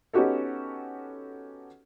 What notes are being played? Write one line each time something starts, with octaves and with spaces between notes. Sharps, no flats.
B3 C#4 D#4 F#4 G4 A4